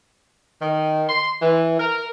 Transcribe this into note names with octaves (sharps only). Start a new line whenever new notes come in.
D#3
C6
E3
A#4